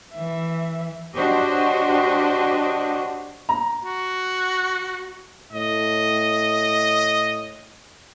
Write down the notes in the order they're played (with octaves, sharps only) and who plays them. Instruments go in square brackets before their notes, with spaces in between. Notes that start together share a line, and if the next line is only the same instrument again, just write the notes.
[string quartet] E3 E5
[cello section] D4 F#4 G4 C5 C#5 D#5
[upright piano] A#5
[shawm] F#4
[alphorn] A2 [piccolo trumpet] D#5